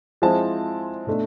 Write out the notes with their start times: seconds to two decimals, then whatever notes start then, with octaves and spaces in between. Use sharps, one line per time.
0.22 F3 G#3 C4 E4 A5
1.07 B2 A3 D4